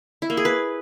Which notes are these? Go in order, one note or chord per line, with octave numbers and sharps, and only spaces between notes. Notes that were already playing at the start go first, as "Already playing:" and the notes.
E4
A#3
G#4
B4